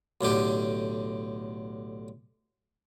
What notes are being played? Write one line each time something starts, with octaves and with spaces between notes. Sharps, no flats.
B1 A2 D3 G4